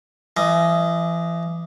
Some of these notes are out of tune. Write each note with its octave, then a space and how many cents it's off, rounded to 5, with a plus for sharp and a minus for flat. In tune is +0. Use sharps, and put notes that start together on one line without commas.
E3 +35 D#5 +0